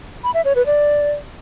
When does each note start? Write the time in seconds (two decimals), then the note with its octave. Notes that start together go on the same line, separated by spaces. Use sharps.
0.24 B5
0.34 E5
0.45 C#5
0.55 B4
0.66 D5